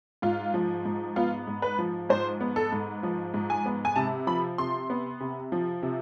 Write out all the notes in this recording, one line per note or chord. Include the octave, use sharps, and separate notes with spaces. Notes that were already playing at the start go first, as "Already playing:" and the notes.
G#2 F4
F3
G#2
B3 F4
G#2
B4
F3
G#2 C5
B3
A4
G#2
F3
G#2
G#5
B3
G#5
C3 A5
F3 B5
C3 C6
B3
C3
F3
C3